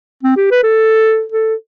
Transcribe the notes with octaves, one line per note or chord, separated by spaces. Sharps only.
C4
G4
B4
A4
A4